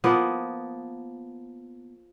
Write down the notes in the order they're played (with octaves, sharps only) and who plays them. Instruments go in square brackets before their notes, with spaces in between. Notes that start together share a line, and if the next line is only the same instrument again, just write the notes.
[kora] F3 A#3 B3